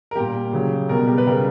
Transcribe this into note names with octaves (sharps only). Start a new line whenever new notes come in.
A#4
A#2 G3 G4
C#3 F#3
B2 G3 A#4
G4
B4
C#3 G3 A#4